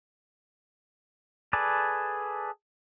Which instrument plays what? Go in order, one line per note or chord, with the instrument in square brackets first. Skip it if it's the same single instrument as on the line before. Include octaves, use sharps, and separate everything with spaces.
[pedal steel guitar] G#4 A4 B4 D5